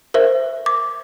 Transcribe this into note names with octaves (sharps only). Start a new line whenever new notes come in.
A#4 C5 E5
D6